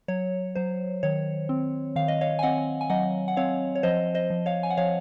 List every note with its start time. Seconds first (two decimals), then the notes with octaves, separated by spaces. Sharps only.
0.08 F#3 C#5
0.55 F#3 C5
1.03 D#3 C#5
1.49 C4
1.96 D#3 F5
2.08 D#5
2.21 C#5 F5
2.39 G#5
2.43 C4 D#5 F#5
2.81 G#5
2.90 F#3 D#5 F#5
3.28 F#5
3.37 C4 C#5 F5
3.75 C#5
3.83 F3 C5 D#5
4.15 C5 D#5
4.30 F3
4.46 C#5 F5
4.63 G#5
4.70 F#5
4.77 F3 C#5 F5